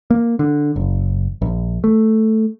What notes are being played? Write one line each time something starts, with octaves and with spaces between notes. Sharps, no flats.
A#3
D3
F#1
A#1
A3